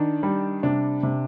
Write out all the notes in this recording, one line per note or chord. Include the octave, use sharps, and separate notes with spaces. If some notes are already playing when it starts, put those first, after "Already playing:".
Already playing: D#3 D4
G3
C3 D4
C3